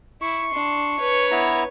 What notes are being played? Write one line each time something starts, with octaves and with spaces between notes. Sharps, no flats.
E4 C#6
D4 C6
B4 C#5
B3 E4 A#5